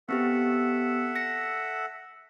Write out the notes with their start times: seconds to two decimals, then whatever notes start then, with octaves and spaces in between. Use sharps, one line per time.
0.09 B3 C4 G4 A4 E5 F#5
1.16 A#6 C#7